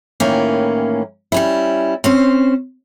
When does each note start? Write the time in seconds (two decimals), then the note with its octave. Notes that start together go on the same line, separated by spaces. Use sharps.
0.20 A2 D#3 E3 A#3 C#4 A#4
1.32 G3 C#4 E4
2.04 C4 C#4 C5